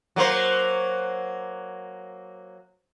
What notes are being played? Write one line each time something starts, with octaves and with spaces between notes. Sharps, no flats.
F#3 A#3 C5